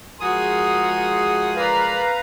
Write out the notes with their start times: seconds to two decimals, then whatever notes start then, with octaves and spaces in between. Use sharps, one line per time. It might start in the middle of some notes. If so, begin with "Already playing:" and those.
0.20 F3 G#3 F#4 G#4 A#4 C6 D#6
1.56 A#4 B4 D5 F5 A#5